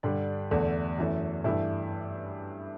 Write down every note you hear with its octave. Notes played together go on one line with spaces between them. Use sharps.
G2 D3 G3 D4
E2 D3 A3
F#2 E3 A3
G2 E3 A3 E4